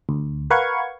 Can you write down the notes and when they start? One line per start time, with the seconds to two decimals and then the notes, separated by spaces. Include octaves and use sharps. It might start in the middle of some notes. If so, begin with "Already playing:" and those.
0.09 D2
0.50 A#4 B4 F5 F#5 C#6 G#6